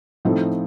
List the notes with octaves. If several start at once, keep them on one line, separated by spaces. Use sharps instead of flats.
A2 F3 C4 D#4 A4